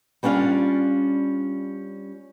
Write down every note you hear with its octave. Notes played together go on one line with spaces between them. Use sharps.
G3 C#4 D4 F4 F5